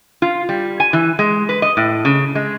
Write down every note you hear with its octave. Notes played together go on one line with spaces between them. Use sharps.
F4
G3
G#5
E3
G#3
B4
D#5
A2
C#3
G#3